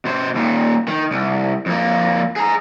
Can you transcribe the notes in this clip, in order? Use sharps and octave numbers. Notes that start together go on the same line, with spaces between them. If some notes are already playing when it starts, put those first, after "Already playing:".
B2 C5
D#2 A#2
D#3
C2
F2 A#3
G#4 A#5